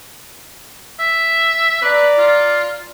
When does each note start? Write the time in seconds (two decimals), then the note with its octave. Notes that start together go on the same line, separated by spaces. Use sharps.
1.00 E5
1.82 B4 D5 A#5
2.19 F4